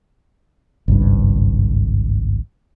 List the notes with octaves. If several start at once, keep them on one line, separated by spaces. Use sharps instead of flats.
G#1 C#2 G2